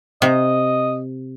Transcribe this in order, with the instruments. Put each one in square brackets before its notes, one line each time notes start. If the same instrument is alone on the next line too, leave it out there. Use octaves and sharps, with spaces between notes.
[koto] C3 [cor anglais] D#5